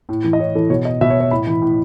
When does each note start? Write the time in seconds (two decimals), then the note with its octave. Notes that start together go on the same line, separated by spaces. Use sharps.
0.09 A2
0.24 E3
0.33 D#5
0.39 A2 C#5
0.55 E3 A4
0.70 B2 C#5
0.85 D#5
1.01 B2 E5
1.10 C#5
1.20 C#5
1.31 A2 B5
1.47 E3
1.62 A2